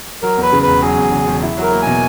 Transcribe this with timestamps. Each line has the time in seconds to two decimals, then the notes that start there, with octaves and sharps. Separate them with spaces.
0.22 F#3 A#4
0.37 E2
0.42 B4
0.53 C#3
0.63 E1 B4
0.82 F#3 G#4
0.97 E2
1.12 C#3
1.27 E1
1.42 E4
1.58 F#3
1.63 A#4
1.72 A#3
1.82 B2 G#5